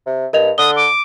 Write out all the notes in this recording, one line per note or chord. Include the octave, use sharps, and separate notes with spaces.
C3
G2 A#4 D#5 F7
D3 D#6 G7
D6